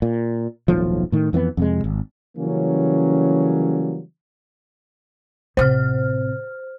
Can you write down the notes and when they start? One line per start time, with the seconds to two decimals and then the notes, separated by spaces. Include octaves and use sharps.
0.02 A#2
0.68 D#1 B1 A2 F3
1.12 A2 D#3
1.33 F2 E3 A#3 B3
1.57 F2 C3 G#3
1.84 G#1
2.37 C#3 E3 F#3 G3 A#3 C#4
5.57 A1 C3 C5 F6